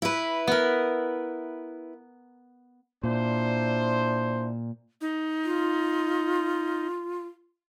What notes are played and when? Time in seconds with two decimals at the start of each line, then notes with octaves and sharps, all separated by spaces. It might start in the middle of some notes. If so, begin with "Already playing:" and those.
0.02 E4 B4
0.47 B3 A#4
3.04 A#2 D4 E4 C5
5.01 D#4
5.45 F4